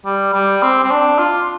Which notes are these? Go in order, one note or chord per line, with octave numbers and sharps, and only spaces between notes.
G3
G3
C4
C4
D4
F4